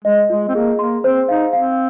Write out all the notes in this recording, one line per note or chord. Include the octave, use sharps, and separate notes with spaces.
G#3 D#5
G#3 F4
C4
A#3 G#4
A#3 C6
C4 C5
D#4 F5
C4 F5